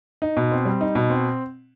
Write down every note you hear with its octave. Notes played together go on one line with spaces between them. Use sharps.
D#4
B2
C4
G3
D#4
B2
C4